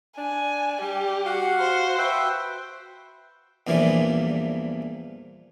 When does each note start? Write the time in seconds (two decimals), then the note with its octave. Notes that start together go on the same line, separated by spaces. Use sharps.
0.18 D4 G#5
0.81 G3 G4
1.26 F#4 F5 F#5
1.60 C5
1.98 F#4 B4 E5 G5
3.67 E2 G2 A#2 E3 F3